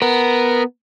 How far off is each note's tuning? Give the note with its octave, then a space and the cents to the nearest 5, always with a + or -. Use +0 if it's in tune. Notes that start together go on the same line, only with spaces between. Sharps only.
B3 +0 A#4 +0